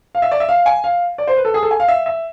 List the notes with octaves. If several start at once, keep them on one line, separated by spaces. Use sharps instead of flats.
F5
E5
D5
E5
F5
G#5
F5
D5
C5
B4
A4
G#4
A4
G#5
F5
E5
E5